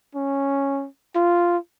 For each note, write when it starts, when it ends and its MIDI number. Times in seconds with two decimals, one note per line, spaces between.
0.15 0.87 61
1.15 1.57 65